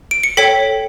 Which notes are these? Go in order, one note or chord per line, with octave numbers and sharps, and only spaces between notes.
D7
C#7
A4 C#5 G5 B6